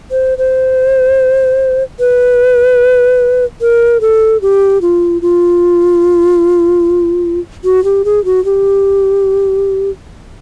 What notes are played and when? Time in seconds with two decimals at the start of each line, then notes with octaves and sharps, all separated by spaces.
0.11 C5
0.38 C5
1.99 B4
3.61 A#4
4.01 A4
4.42 G4
4.81 F4
5.22 F4
7.64 F#4
7.84 G4
8.05 G#4
8.25 F#4
8.45 G4